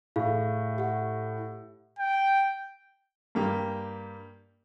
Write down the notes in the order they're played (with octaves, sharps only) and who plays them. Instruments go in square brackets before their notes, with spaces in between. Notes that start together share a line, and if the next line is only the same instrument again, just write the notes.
[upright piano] A2 [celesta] G#4 F5
[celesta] G4 F#5
[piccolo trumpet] G5
[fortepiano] G2 A#3 G4